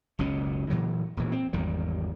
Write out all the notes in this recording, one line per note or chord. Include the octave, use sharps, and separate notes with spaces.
F#1 C#2 B2 C#4
A#2 E3 F#3
E1 A#2 E3
C4
G#1 E2 D#3 G3